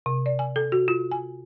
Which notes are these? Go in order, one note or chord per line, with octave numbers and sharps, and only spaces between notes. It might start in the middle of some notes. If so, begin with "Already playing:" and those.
C3
D5
G#5
A4
F#4
F4
G#5